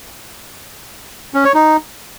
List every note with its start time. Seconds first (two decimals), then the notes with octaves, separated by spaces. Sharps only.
1.34 C#4
1.44 C#5
1.55 D#4